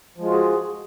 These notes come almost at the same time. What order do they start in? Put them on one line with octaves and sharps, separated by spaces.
F3 G#3 F4 F#4 G#4